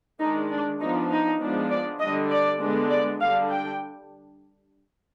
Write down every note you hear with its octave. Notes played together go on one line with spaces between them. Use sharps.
D#3 G#3 D4 D#4
D4
F3 B3 D4 D#4
D#4
F3 G#3 B3 D4
D5
D3 G3 D4 D#5
D5
D3 G#3 B3 D4
D5
D3 G3 D4 F5
G5